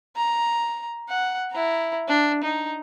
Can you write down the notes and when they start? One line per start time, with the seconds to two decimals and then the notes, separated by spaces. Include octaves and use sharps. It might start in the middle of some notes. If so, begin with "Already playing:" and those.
0.16 A#5
1.09 F#5
1.52 E4 A#5
2.08 D4
2.43 D#4